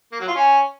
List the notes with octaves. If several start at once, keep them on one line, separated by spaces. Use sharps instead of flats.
A#3
F#3
F4
C#4